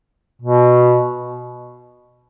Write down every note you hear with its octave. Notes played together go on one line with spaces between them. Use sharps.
B2